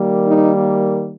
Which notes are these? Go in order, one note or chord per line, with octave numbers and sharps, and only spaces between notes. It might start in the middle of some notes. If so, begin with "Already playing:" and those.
Already playing: D#3 G3 A#3
D#4